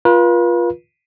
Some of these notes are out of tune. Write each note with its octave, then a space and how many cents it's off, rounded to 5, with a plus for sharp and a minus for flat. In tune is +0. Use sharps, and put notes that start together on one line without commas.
F4 +0 B4 -40